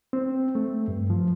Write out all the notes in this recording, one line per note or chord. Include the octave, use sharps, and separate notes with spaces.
C4
A3
G2
F3